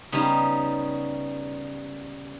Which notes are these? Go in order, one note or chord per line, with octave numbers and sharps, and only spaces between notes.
C#3 G3 B3 D#4